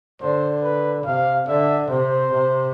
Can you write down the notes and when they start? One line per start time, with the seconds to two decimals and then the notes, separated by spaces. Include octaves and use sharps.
0.21 D3 C5
0.63 B4
1.06 C3 F5
1.48 D3 E5
1.90 C3 C5
2.32 C3